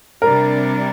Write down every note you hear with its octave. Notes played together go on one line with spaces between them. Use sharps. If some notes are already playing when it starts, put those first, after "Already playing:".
C3 G3 D4 A#4